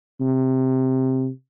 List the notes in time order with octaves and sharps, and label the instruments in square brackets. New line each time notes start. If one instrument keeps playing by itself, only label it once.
[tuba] C3